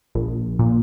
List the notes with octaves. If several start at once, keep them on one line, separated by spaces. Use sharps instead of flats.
A#1
A#2